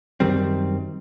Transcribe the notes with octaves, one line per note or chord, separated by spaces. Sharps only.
F#2 D#3 G3 C4